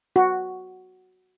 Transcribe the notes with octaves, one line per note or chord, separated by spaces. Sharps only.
F#4